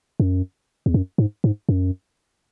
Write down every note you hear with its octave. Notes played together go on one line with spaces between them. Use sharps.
F#2
E2
F#2
G#2
G#2
F#2